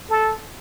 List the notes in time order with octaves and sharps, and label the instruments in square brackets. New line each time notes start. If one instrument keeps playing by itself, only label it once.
[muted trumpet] A4